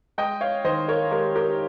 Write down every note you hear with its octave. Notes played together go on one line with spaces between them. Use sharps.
G#3 D#5 G5
C#5 F5
D#3 C5 D#5
A#4 C#5
G#3 G4 A#4
G4 A#4